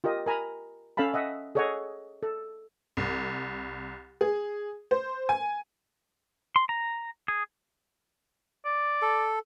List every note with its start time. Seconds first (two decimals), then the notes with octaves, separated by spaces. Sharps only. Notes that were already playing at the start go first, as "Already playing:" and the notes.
0.04 F4 G4 A#4 D#5
0.26 A#4 G#5 A#5 B5
0.97 C#4 A4 F5 A5 B5
1.14 D#5 E5 F#5
1.55 G#4 A4 C#5 D#5 F#5 G#5
2.23 A4
2.97 C2
4.21 G#4
4.91 C5
5.29 G#5
6.56 C6
6.69 A#5
7.28 G#4
8.65 D5
9.02 A4